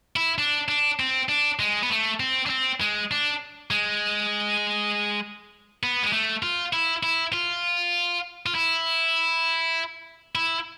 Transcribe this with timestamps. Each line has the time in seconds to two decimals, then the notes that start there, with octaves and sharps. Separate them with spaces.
0.16 E4
0.38 D4
0.68 D4
1.00 C4
1.29 D4
1.59 G#3
1.83 B3
1.90 A3
2.20 C4
2.46 D4
2.50 C4
2.81 G#3
3.11 D4
3.71 G#3
5.83 B3
6.03 G#3
6.13 A3
6.43 F4
6.73 E4
7.03 E4
7.33 F4
8.46 F4
8.55 E4
10.35 E4